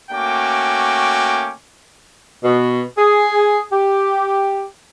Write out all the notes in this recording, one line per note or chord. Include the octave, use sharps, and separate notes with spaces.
A3 A#3 C#4 F#4 G5 D6
B2
G#4
G4